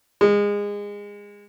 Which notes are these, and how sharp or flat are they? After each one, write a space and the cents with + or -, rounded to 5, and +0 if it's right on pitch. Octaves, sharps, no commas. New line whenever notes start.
G#3 -25